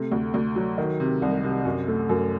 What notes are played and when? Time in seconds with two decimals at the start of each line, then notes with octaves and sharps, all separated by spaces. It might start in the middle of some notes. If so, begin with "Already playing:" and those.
Already playing: C3 A3
0.12 D2
0.34 D2
0.56 F#3
0.78 D#3
1.00 C3
1.22 C2
1.44 C3
1.65 F#2
1.88 A3
2.09 F#2